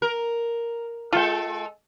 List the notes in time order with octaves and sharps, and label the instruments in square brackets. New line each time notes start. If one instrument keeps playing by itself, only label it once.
[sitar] A#4
[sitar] G#3 A4 [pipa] F4 G5